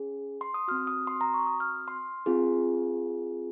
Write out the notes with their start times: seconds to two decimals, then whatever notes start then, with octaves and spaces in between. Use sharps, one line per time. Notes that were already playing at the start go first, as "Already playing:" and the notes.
Already playing: C#4 G#4
0.41 C6
0.54 D#6
0.68 C4 F#4 F6
0.87 D#6
1.07 C6
1.21 A#5
1.34 C#6
1.47 D#6
1.60 F6
1.88 C6
2.26 C4 F4 G#4